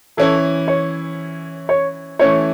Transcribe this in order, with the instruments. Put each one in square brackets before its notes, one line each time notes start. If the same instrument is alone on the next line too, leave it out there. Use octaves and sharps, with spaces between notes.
[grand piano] E3 C#4 E4 [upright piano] A4
[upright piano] C#5
C#5
[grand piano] E3 A3 C#4 E4 [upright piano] C#5